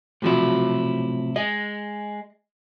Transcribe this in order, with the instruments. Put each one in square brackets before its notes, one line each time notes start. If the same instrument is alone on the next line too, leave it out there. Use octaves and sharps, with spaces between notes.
[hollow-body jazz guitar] B1 F3 F#3 [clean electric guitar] A2 C3 E4
[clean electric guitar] G#3 [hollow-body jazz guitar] D#5